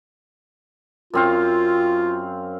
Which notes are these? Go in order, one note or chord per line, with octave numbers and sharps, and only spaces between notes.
F#2 C4 F4 F5